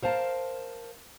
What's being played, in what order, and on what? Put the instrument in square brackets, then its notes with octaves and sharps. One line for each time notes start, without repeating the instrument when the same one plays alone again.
[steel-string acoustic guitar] A#4 C5 F5 A5